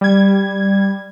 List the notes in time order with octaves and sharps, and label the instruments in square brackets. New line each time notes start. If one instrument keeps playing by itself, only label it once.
[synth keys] G3 G#6